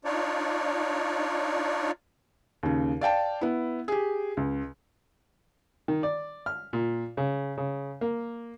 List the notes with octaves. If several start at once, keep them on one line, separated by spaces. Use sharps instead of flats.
D4 D#4 F4 C#5 D5
D#2 C#3
D5 F5 G5 A5
B3 E4
G4 G#4
C#2
D#3
D5
F6
A#2
C#3
C#3
A#3